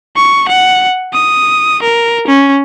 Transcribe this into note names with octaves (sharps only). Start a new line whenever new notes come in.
C#6
F#5
D#6
A#4
C#4